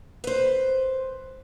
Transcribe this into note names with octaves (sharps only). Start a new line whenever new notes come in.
B4 C5